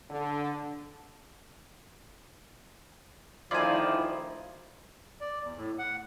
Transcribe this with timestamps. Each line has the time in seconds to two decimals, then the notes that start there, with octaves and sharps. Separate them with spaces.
0.10 D3
3.51 D2 D#3 F3 E4 F4 D5 G#5
5.21 D5
5.43 E2
5.57 A2
5.79 F#5